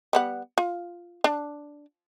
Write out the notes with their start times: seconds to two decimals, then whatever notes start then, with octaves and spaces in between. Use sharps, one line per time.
0.13 G3 B3 F#5
0.58 F4
1.24 D4